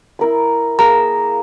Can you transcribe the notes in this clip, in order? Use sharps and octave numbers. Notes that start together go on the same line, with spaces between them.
E4 A#4 B5
A#3 G#4 A#5